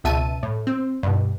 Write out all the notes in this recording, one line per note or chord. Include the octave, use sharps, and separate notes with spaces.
C#2 B2 E5 A5 D#7
A2
C4
G2 B2